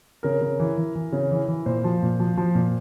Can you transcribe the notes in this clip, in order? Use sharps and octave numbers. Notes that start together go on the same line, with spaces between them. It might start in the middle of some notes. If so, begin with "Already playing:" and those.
C#3 A#4
C#3
E3
E3
E3
C#3
E3
E3
A#2 C5
F3
A#2
F3
F3
A#2